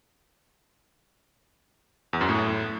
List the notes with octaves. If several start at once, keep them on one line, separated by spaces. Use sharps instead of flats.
E2
F#2
A2